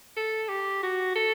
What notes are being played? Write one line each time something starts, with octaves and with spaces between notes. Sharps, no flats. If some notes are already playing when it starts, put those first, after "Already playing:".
A4
G4
F#4
A4